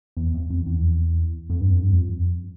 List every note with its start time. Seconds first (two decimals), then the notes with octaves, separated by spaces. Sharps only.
0.17 E2
0.34 F2
0.50 F2
0.66 E2
1.50 F2
1.61 G2
1.71 F2
1.82 G2
1.93 F2